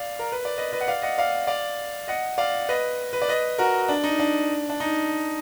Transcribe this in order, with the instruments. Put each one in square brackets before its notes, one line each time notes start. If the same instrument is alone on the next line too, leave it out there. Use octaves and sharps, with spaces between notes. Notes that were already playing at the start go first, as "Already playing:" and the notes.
Already playing: [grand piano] D5 F5
A#4
B4
D5
B4 D#5
B4 D#5
F#5
D5 F5
D#5 F#5
D5 F5
D5 F5
D#5 F#5
D5 F5
B4 D#5
B4
D5
B4 D#5
F#4 A#4
D4
D#4
D4
D4
D#4